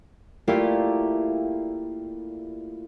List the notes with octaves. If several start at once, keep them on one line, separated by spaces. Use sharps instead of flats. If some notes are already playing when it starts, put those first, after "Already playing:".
A3 A#3 E4 F4 G4 D5